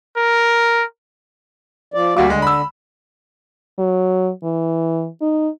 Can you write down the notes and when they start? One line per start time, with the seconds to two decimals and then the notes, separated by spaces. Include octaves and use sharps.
0.16 A#4
1.94 F3 D5
2.17 D2 G3 A#3 F#4 F5 D6
2.30 D3 G#3
2.42 B5 E6
3.79 F#3
4.44 E3
5.22 D#4